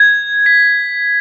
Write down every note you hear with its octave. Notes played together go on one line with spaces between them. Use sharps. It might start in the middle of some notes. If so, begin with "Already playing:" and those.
Already playing: G#6
B6